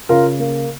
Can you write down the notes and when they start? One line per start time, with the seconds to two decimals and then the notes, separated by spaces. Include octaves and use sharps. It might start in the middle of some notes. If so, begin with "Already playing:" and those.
0.09 C#3 F4 A#4
0.40 A#3